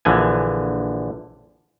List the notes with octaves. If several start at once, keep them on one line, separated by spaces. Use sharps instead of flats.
A#1 D3 E3 F3 G#5